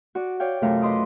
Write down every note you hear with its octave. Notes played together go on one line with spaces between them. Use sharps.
F#4 D5
C#5 D5 F5 G5
F#2 C3 A3 F4 A#4 F5
B4 D#5 C6 D6 D#6